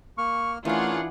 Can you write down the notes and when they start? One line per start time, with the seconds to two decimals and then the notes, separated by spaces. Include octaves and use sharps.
0.18 A#3 C#6 F6
0.65 E3 A3 C#4 D4 F4 G#4 A#4 F#5